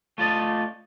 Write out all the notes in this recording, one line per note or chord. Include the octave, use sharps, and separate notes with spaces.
A3 F4 A4 D5 D#5